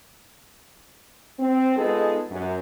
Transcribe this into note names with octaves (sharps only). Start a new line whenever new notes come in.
C4
G#3 B3 D#4 F4 G#4 A4
F#2